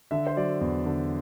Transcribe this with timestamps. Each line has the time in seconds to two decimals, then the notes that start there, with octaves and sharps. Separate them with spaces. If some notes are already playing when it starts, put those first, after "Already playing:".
0.11 D3 E5
0.27 C5
0.37 F#3 D5
0.61 E2
0.86 D3